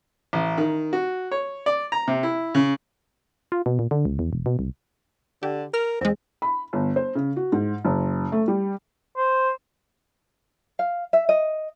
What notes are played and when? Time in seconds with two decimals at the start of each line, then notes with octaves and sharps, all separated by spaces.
0.33 A1
0.58 D#3
0.93 F#4
1.31 C#5
1.66 D5
1.92 A#5
2.08 C3
2.23 E4
2.55 C#3
3.52 F4
3.66 B2
3.79 A#2
3.91 D3
4.05 C#2
4.19 E2
4.33 E1
4.46 B2
4.59 C2
5.43 D3 G4
5.74 A#4 F6
6.01 E2 G#3 C4
6.42 B5
6.73 G1
6.96 C5
7.15 C#3
7.36 F#4
7.52 G#2
7.85 F#1
8.32 A3
8.48 G3
9.17 C5
10.79 F5
11.13 E5
11.29 D#5